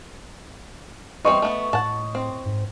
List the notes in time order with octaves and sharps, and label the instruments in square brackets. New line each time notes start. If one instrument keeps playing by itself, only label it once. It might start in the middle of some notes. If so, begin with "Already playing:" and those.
[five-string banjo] E3 G3 C4 [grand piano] D#5 C#6
[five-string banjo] A3 B3
[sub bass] A2 [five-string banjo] F#5 A5
[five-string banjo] C4
[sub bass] G#2